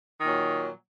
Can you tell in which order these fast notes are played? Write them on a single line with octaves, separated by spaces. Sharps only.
D#3 A#2 F#3